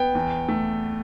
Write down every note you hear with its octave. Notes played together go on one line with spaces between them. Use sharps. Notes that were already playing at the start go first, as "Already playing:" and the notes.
Already playing: B3 G5
E2
A3